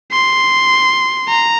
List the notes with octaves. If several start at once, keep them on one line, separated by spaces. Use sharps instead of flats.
C6
A#5